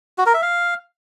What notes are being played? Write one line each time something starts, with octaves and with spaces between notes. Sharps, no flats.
F#4
A#4
E5
F5